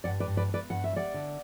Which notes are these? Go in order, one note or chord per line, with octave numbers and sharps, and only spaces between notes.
G2 D5 F#5
B4 D5
G2
B4 D5
B3
B4 D5
G2 F#5
E5
G3 D5 F#5
D3